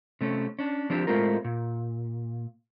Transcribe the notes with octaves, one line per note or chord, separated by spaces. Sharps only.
C3 A3 C#4
C#4 D4
F3 C4 D4 G4
A2 G#3 A3 C4 F4 A#4
A#2